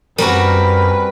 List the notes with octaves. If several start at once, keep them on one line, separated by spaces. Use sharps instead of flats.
F#2 G3 C4 F#4 A#4 B4 G#5